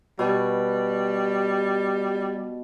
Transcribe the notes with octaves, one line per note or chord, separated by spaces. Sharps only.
B2 G3